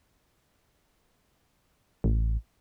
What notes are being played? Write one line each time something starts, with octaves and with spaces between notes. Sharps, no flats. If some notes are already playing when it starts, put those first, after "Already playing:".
A1